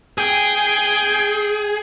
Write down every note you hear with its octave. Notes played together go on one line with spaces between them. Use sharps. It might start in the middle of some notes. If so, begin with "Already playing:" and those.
G#4 G5